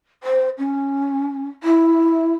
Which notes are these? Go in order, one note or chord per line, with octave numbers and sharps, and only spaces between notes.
C5
C#4
E4